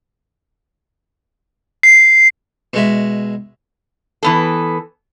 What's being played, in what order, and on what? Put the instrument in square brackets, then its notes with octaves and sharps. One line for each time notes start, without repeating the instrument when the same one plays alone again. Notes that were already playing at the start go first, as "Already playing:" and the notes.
[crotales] C7
[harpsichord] B2 G#3 E5
[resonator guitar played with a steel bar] E3 B3 A4